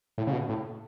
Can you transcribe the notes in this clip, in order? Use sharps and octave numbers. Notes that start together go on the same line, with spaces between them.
A2
C#3
B2
A2